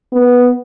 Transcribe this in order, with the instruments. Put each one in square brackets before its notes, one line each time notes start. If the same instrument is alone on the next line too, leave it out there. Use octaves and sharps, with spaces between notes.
[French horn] B3